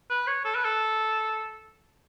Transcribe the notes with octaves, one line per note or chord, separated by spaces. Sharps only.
B4
C#5
A4
B4
A4